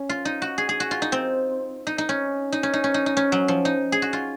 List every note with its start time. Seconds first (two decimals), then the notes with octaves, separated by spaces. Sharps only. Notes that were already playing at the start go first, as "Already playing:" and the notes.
Already playing: C#4
0.09 F4
0.25 D#4
0.42 F#4
0.58 G#4
0.69 G#4
0.80 F#4
0.91 F4
1.02 D#4
1.12 C4
1.87 D#4
1.98 D#4
2.09 C#4
2.52 D#4
2.63 C#4
2.74 D#4
2.84 C#4
2.94 D#4
3.06 D#4
3.17 C#4
3.32 F#3
3.48 F3
3.65 D#4
3.92 G#4
4.02 F#4
4.13 F4